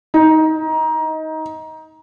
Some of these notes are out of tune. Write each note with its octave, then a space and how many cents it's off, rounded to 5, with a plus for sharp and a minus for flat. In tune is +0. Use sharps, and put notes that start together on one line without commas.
D#4 +20